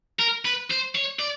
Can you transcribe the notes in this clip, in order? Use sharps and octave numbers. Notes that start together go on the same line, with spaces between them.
A#4
B4
C5
C#5
D5